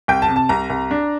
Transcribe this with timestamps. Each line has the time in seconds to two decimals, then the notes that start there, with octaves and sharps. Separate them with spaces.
0.08 C2 G5
0.22 A5
0.28 C3
0.36 A5
0.49 C2 A#5
0.70 C2
0.91 D4